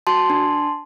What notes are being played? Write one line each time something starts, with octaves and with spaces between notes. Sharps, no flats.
F#4 A5 C6
D4